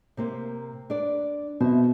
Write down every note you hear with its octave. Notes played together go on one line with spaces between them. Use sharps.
C3 A#3 C5
D4 B4 D5
B2 C5 E5